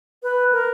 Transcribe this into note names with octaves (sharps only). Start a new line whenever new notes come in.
B4
A#4